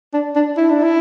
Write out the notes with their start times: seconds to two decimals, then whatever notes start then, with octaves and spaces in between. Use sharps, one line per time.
0.14 D4
0.36 D4
0.57 E4
0.70 D4
0.83 E4